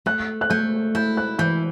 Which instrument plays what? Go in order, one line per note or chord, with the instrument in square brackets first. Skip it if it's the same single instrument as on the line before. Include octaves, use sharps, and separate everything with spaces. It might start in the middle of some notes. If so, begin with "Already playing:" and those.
[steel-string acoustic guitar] A3 [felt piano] F#6
[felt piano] F#6
[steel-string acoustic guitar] A3 [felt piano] G6
[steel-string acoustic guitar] E4 [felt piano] G6
[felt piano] F#6
[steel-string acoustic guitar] E3 [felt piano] G6